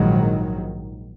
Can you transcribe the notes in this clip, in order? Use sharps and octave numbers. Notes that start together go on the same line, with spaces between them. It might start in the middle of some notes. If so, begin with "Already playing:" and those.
Already playing: A#1 G#2 D#3 F#3